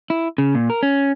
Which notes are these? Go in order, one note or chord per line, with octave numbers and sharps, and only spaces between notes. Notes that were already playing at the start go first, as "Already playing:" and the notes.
E4
C#3
A#2
A#4
C#4